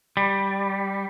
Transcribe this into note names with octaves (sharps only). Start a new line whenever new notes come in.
G3